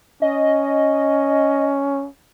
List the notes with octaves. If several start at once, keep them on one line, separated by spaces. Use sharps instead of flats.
C#4 D#5